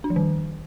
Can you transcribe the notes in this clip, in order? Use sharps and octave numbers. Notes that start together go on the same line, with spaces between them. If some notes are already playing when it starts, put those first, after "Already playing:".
D4
F3
D#3